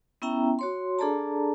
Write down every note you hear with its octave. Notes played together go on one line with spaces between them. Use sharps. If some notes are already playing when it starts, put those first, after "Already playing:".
B3 C#4 E4 E5 G5 A#5
F#4 C#5 C6
D4 G#4 A4 D5 A5 A#5